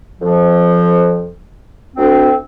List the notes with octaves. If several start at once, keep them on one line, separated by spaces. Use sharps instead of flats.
F2 F3
D2 C4